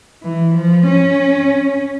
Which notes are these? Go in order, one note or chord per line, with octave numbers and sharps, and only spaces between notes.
E3
F3
C#4